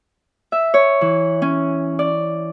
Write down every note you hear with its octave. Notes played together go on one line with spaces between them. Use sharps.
E5
C#5
E3
C#4
D5